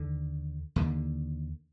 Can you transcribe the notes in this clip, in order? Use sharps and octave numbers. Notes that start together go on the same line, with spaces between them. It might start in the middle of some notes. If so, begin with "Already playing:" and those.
Already playing: D#2 D3
D#2 D3